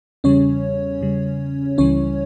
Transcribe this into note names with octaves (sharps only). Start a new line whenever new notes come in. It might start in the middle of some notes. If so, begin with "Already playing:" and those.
E2 C#3 G3 C#4 C#5
E2 C#3 G3
C#2 C#3 E3 G3 C#4 C#5